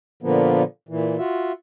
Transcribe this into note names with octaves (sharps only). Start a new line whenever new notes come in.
A#2 D3 F3 A#3 B3
A#2 E3
F4 F#4 E5